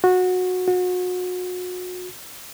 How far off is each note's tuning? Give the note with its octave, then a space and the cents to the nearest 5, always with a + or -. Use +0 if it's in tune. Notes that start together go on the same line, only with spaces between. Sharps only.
F#4 -20
F#4 -35